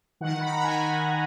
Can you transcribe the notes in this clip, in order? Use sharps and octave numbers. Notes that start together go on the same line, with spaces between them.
D#3 F#5
B5
A#5
D#3 G#5